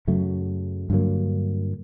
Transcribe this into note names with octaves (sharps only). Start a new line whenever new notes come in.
F#2 C#3 F#3 A3
G2 D3 F#3 A#3